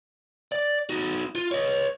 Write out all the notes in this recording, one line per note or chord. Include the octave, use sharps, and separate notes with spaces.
D5
D#4 F#4
F4
C#5 D#5